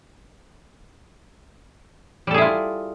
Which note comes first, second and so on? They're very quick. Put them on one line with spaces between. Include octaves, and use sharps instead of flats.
G3 A4 G#4 E4 F4